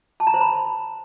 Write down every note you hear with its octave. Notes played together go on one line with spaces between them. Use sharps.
A5
A#5
C5
B5